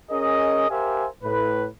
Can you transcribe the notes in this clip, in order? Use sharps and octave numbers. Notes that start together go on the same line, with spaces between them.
C#4 G#4 A#4 D#5
G4 A#4 C5 E5 F5 G#5
A2 B4